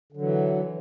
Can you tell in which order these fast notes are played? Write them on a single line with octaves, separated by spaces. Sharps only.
D3 F#3 E3